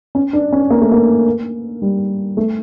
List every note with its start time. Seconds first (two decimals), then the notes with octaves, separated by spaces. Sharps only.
0.15 C#4
0.33 D4
0.53 C#4
0.70 A#3
0.82 A3
0.92 A#3
1.82 G3
2.37 A3